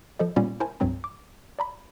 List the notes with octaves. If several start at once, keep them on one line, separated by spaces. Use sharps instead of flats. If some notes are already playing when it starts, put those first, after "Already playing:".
F3 A4 D#5
A#2 G3 A#3 B3 C#4
E4 A#4 C5 G#5 A5
C2 G2 F#3 C4 A#5
D6
D5 A#5 B5